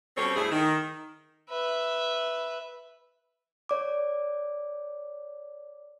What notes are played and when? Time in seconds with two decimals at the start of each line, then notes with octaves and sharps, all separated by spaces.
0.17 B2 G3 C4 C#4 A4 C#5
0.35 G2 A3 E4 G#4
0.52 D#3
1.49 B4 E5
3.69 C#5 D5 D6